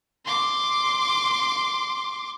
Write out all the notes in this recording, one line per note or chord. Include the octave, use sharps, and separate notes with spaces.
C6 D6